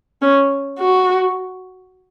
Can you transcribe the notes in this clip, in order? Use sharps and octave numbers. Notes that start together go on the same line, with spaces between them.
C#4
F#4